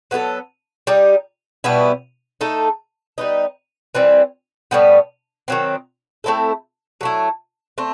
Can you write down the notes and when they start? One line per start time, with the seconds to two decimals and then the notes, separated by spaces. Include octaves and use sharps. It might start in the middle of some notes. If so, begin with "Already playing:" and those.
0.11 F#3 B3 D#4 A4
0.87 G3 D#4 G4
1.64 B2 G3 B3 E4
2.41 A3 D#4 A4
3.18 G3 B3 D#4
3.95 E3 G3 C4
4.71 A2 G3 B3
5.48 D#3 F#3 C4
6.24 A3 C4 E4 A4
7.01 F#3 A3 E4
7.78 A3 C4